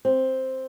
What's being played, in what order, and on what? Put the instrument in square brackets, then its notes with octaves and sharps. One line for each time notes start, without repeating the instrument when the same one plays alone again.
[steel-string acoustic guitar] C4